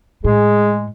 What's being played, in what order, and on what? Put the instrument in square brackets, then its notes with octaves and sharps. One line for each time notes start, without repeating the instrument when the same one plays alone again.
[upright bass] A2 [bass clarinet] G#3 [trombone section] G#4